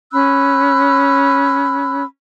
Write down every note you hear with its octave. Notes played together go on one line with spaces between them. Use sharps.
C#4 B5 E6 F#6